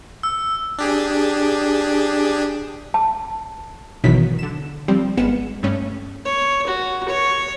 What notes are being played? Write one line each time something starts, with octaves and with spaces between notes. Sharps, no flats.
E6
D4 G4 G#4
A5
G#1 B2 D#3 E3 F#3 B6
D3 E7
F3 G3 C4
G#1 G#3 B3 F6 C#7 E7
G2 G3 A3 C#4
C#5
F#4
C#5